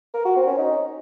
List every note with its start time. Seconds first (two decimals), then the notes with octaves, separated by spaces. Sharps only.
0.14 A#4
0.25 F#4
0.36 C4
0.47 C#4
0.58 D#4